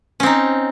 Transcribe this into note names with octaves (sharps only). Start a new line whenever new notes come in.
C4 C#4 D#4